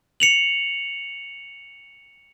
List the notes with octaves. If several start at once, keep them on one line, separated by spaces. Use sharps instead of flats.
C#7 F7 F#7